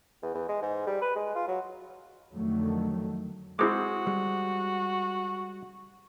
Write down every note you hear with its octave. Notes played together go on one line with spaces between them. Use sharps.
E2
E2
G#3
G#2
G3
B4
G#3
F4
F#3
F2 D3 D#3 F#3 A3
G#3 C4 E4 F#4 G#4 D6
G3